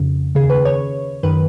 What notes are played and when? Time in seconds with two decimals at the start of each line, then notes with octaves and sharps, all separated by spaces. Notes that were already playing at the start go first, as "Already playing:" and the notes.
Already playing: F2 C#3
0.35 D#2 C#3 G#4
0.50 B4
0.65 C#5
1.23 F#2 D#3 B4